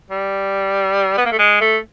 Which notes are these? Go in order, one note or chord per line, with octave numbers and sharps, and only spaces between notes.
G3
B3
A#3
A3
G#3
A3